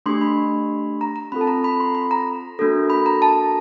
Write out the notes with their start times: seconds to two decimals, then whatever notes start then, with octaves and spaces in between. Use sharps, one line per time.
0.06 A3 D4 G4 C6
0.21 B5
1.01 A#5
1.16 A#5
1.32 C4 F4 A4 B5
1.41 A5
1.47 A#5
1.64 B5
1.80 C6
1.95 B5
2.11 A#5
2.59 A#3 D4 F#4 A4
2.90 B5
3.06 A#5
3.22 A5